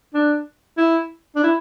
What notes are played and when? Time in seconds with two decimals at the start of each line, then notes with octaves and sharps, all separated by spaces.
0.14 D4
0.78 E4
1.36 D4
1.44 E4